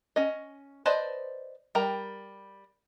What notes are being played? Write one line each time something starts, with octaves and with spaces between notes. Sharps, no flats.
C#4 D#5
B4 C5 D5 D#5 A5
G3 A#4 G5 A#5